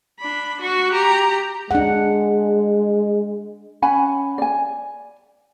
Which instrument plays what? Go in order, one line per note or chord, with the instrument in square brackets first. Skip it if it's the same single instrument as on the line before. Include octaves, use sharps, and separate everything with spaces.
[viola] D4 B5
F#4 C#6
G4 A#5
[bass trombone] G#3 [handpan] D4 F#5
[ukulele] C#4 F#5 G#5 B5
D5 G#5